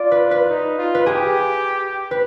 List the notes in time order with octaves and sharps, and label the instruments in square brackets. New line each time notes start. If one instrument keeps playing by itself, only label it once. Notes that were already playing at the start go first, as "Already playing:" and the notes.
Already playing: [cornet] F4 [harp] D5
[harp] B4
B4
[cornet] D#4
F4
[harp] B4
[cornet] G4 [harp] G#4
[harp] B4